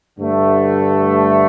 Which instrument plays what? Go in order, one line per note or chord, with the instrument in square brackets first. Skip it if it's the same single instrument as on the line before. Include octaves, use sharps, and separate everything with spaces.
[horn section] G2 D3 A3